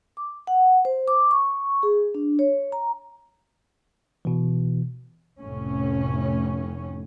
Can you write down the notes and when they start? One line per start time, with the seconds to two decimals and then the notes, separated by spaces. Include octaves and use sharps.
0.17 D6
0.47 F#5
0.85 C5
1.08 D6
1.31 C#6
1.83 G#4
2.15 D4
2.39 C#5
2.72 A#5
4.25 B2 E3
5.40 F1 A2 C#4